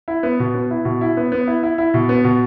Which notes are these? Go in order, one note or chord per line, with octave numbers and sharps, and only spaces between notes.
E4
B3
B2
B3
E4
B2
E4
B3
B3
E4
E4
E4
B2
B3
B2